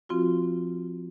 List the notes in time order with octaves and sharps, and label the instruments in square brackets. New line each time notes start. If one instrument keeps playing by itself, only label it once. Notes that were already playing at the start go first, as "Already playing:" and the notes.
[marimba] F3 C4 F4 F#4